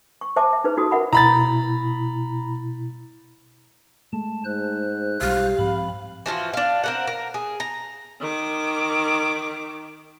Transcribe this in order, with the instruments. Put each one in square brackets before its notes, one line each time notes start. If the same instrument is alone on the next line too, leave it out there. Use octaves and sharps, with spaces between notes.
[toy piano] C#6
C5 E5 A5 D6
E5
D#4 E4 G#4 B4 C5
D#4 F4 F#4 A4 D#6
A#4 E5 F#5 B5
[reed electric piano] B2 E4 [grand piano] A#5 B5 A6
[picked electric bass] G#3 A3 [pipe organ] A5
[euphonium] G#2 [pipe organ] C5 F#6
[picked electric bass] B1 G3 [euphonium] G4 [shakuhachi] F5
[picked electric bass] G#2 F3 [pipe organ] C4 B5
[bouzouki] E3 F3 F4 F#4
D4 F5
C4 A#4 F#5
A#4
G#4
A#5
[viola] D#3 D6